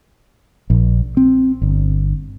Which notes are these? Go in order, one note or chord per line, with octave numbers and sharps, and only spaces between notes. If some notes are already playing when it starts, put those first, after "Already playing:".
A#1
C4
G1